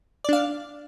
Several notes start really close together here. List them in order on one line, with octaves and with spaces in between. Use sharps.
D5 D4 F5